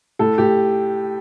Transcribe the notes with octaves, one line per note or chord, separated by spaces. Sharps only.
A2 A4
A2 G4